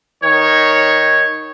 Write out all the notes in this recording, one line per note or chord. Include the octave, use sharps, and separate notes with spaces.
D#3 C#5